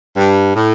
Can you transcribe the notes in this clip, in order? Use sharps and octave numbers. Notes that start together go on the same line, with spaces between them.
G2
A2